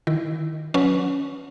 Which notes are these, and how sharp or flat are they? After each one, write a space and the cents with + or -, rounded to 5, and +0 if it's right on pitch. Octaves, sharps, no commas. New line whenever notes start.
D#3 -5 E4 +0
F#3 -25 C#4 +5 B4 +0